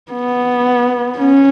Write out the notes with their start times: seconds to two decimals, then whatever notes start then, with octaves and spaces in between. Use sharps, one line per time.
0.12 B3
1.18 C#4